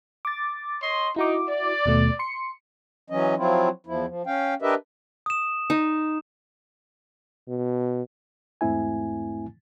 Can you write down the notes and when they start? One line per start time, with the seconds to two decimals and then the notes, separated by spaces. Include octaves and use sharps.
0.25 D6 A6
0.82 C#5 D#5 C6
1.16 D#4 E4 F#4 D6
1.49 D5
1.85 D#2 B2 A3
2.19 C6 C#7
3.10 E3 F#3 C#4 D#5
3.37 F3 F#3 C4 E4 F4
3.87 E2 F3 E4
4.07 F3
4.26 C#4 F5 G5
4.62 D4 G4 A#4 B4 D#5 E5
5.26 D#6 E7
5.70 D#4
7.49 B2
8.61 E2 G#2 A3 C4 E4 G#5